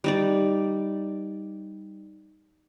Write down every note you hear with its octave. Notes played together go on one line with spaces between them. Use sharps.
G3 D#4 D5